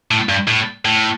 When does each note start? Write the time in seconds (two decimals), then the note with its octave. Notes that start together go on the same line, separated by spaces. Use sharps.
0.11 A2
0.29 G2
0.48 A2
0.85 A2